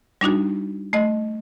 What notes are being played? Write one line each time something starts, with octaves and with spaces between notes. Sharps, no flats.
G3 D4 D#4 F#4
A3 D#5